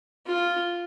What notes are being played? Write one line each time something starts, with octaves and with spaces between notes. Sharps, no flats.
F4